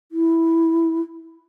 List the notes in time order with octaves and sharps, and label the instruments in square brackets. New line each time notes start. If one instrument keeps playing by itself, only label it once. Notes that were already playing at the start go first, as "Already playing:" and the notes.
[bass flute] E4